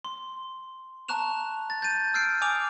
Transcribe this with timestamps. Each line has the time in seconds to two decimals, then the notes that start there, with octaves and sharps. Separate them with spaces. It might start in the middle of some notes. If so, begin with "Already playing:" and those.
0.05 C6
1.08 A5 A#5 C#6 F#6 E7 F7
1.70 A6
1.82 G6 A6 D#7
2.14 E6 F6 G6 C7 D7
2.41 G#5 D6 D#6 D7 F7